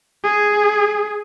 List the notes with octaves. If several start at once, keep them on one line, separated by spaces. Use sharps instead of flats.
G#4